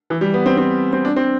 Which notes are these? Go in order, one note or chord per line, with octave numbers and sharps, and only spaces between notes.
E3
G3
B3
C4
C4
C4
D4
C4